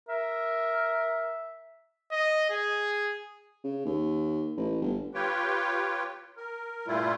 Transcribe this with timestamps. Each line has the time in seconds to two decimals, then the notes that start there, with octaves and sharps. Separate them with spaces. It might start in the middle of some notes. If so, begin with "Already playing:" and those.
0.09 A#4 E5
2.12 D#5
2.50 G#4
3.64 C#3
3.85 D#2
4.57 A1
4.82 G1
5.14 F4 G4 B4 C#5 G5
6.37 A#4
6.87 G2 A#2 G3 A3 E4 F4